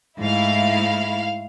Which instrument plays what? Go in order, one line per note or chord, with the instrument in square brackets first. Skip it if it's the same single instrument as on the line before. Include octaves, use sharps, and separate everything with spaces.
[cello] G#2 A3 [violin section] E4 F5